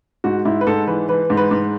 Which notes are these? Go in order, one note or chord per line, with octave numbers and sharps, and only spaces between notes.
G#2 F#4
G#2 E4
B4
G#2 A4
E3 B4
E3 B4
G#2
B4
G#2